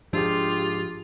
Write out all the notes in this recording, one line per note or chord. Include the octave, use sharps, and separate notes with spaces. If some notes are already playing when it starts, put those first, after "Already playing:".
G#2 F3 G#3 D4 F4 G4 G#4